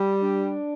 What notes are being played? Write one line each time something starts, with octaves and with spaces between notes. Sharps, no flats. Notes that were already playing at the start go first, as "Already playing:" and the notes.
Already playing: G3
D4